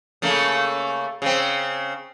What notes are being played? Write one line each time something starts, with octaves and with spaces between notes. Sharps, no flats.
C#3 A3 A#3
C#3 C4